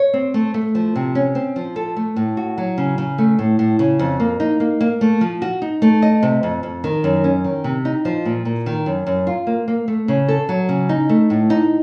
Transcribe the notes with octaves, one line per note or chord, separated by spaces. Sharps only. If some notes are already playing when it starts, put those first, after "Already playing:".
Already playing: C#5
C4
A3
A3
F3
C3
C#4
C4
F3
A4
A3
A2
F#4
F#3
C#3
C#3
A3
A2
A2
C#3
F2
A#3
D#4
A#3
A#3
A3
F3
F#4
D#4
A3
D#5
C3
F2
F2
D#3
F#2
C#4
D#3
C3
D#4
F3
A#2
A#2
D#3
F#2
F#2
F4
A#3
A#3
A3
C#3
A4
F#3
C#3
D#4
A3
A2
D#4